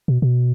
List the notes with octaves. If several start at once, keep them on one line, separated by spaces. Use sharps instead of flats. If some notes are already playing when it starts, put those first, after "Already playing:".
B2
B2